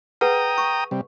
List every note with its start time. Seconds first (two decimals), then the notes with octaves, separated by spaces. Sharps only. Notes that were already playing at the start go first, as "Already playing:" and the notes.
0.21 G#4 B4 F#5 G5 A#5 D#6
0.58 C#6
0.91 C3 G3